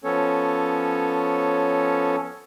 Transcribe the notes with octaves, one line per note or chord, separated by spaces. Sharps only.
F3 B3 C#4 A4 C#5